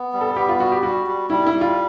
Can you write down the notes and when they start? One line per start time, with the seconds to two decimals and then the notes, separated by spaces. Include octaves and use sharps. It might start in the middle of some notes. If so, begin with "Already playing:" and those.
Already playing: B3
0.13 G3
0.21 A4
0.36 B3 G4
0.49 F4
0.60 G3 F#4
0.72 G4
0.83 G3 F#4
1.07 G3
1.30 G3 E4
1.46 E4
1.54 G3
1.61 F4